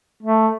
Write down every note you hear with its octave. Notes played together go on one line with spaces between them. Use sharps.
A3